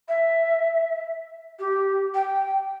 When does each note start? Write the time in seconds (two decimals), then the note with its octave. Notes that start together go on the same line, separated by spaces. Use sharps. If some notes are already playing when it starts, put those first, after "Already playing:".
0.08 E5
1.59 G4
2.14 G5